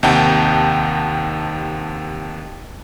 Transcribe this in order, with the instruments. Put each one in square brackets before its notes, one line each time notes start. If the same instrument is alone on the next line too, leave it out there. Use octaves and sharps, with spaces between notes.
[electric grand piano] D#2 C3 D#4 F#5 G5 A5